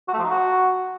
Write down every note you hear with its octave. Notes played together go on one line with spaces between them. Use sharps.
F#4
A3
F3
D#4
F#4